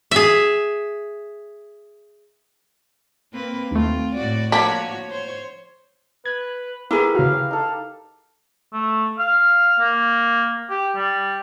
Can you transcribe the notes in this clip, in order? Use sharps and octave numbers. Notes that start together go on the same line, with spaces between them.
G#4 E5
A#3 C4 B4
D#2 A3 C4 F4
A2 F#4 D5
F3 A#3 D4 F#4 C#5 B6
C5 C#5
B4 G#6
E4 G4 G#4 A#4 B4
C#3 F#4 F5 A#5
D#4 A4 F5
A3
F5
A#3
G4
G3